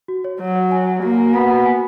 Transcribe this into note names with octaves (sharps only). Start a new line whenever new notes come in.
F#4
C#5
F#3 C#5
C#5
G#5
G#5
A#3 F#4
F#4
B3 F#4
F#4
G#5